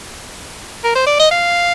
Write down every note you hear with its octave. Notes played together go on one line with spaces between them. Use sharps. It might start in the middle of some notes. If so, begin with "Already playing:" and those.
A#4
C5
D5
D#5
F5